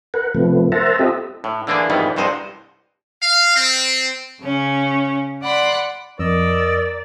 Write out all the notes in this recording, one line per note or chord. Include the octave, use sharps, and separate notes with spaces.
A#4 B4 F#5
C3 F3 A3 B3
A#4 C5 E5 F#5 A5 A#5
C4 F4 G4 A4 D#5 E5
A2
D3 E3 A#3 D4 G#4
F2 G#2 D#3 E3 G3 B3
C2 G2 C3 C5 D#5 F#5
F5
C4
C#3 C#4
D5 F#5 B5 C6
F2 A#4 D5 D#5 E6